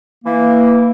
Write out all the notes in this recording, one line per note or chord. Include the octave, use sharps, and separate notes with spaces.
E3 A#3